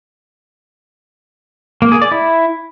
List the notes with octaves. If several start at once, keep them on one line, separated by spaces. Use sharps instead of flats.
A#3
G#4
D5
E4